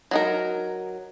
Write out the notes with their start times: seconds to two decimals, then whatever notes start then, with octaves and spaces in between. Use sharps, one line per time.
0.11 F#3 D#4 A#4